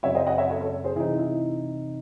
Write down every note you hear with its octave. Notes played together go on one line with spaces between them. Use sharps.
F#2 C#3 F#3 C4 C#5 E5
C5 D#5
D#5 F#5
C#5 E5
A4 C#5
A4 C#5
G#4 C5
C3 E3 C4 D#4 E4 G#4
E4